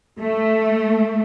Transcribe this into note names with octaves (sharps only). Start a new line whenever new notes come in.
A3